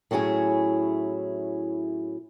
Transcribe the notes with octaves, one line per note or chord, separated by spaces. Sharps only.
A2 F#3 C#4 E4 G#4